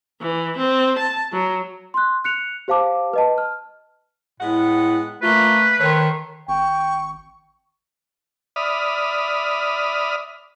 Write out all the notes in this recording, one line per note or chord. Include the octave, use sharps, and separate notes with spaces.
E3
C4
A5
F#3
C6 F#6
F#6 C#7 F7
G4 C5 F5 A5 D6
B4 D#5 A5
F6
A2 G#3 B3 F#5
A3 A#3 F4 B4
D#3 A4 C5 C#5
G#1 G5 C#6
D5 E5 B5 D#6 F6